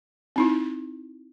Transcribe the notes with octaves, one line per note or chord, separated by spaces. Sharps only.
C4 D#4 E4